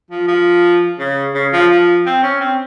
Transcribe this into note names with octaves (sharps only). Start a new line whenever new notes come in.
F3
F3
C#3
C#3
F3
F3
C4
C#4
C4